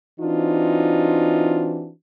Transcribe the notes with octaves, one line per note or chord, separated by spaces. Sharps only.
E3 C4 D4 D#4 F4 F#4